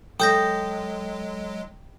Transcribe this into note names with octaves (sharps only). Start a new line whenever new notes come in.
F#3 G#3 A4 G5 D#6 G6 A#6